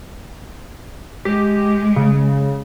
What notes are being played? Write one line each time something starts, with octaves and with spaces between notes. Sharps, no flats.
G#3 G4
C#3